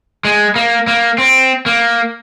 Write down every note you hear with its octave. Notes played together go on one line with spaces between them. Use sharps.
G#3
A#3
A#3
C4
A#3